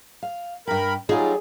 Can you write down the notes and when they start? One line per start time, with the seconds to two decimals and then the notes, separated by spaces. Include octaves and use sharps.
0.22 F5
0.67 G2 A#4 G5 B5
1.09 F#3 G3 D#4 F4 G#4 D5